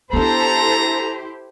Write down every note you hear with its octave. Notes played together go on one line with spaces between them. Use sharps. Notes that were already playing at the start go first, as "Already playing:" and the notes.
B3 D4 E4 G4 A4 C5 A#5